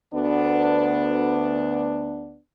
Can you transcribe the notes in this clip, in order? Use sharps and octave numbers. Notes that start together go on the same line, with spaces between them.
D2 B3 D4